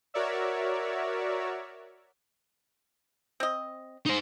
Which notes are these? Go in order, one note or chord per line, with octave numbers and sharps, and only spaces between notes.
F#4 A#4 C#5 D5 E5
C4 D#5
D#4 C5